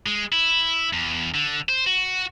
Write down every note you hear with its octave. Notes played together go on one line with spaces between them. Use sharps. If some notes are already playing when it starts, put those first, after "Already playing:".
G#3
E4
E2
D3
C5
F#4